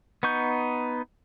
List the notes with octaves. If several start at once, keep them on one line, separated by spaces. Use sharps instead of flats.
B3 D#4 C#6 G6